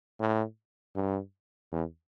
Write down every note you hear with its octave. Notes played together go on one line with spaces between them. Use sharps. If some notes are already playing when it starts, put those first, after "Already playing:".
A2
G2
E2